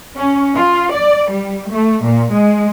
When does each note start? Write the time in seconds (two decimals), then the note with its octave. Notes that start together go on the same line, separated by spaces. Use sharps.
0.16 C#4
0.55 F4
0.91 D5
1.31 G3
1.71 A3
2.03 A#2
2.32 G#3